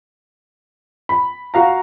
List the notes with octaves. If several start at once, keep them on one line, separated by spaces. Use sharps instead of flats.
B5
F#4 F5 A#5